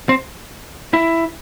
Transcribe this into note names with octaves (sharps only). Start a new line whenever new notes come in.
C4
E4